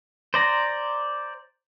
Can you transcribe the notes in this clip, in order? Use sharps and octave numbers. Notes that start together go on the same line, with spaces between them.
C5 D5 A#5